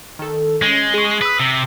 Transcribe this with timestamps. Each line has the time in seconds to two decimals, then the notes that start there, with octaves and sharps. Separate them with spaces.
0.19 D#3 A4
0.62 G#3 C#4
0.94 G#4 C#6
1.21 B4 D#6 E6
1.40 C3